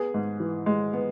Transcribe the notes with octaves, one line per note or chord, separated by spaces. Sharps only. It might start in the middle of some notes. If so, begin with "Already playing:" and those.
Already playing: B3 G#4
G#2
E3
G#3
B3